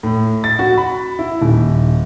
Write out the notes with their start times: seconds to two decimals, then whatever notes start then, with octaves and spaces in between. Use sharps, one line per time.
0.03 A2
0.44 A6
0.59 F#4
0.77 B5
1.19 E4
1.41 D#1